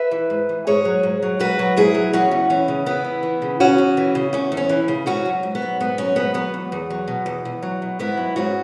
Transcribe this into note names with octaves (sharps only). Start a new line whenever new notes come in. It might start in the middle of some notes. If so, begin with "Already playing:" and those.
Already playing: B4 E5
E3
G#2
E3
G#2 G#4 C#5
F#3
G#2
F#3
G#2 F#4 B4
F#3
G#2 E4 G#4
F#3
E2 C#4 F#4
E2
E3 C#4
C#3
E2 B3 E4
E2
E3
C#3
E2 C#4 F#4
E2
E3
C#3
E2 C#4
E2
C#4
E3
C#3
G#2 C#4 F#4
F#3
G#2
B3
F#3
G#2 B3
F#3 C#4
G#2 B3
F#3 B3
E2
E2
F#3
B2
E2
E2
F#3
B2
G#2 B3 E4
F#3
G#2 C#4 F#4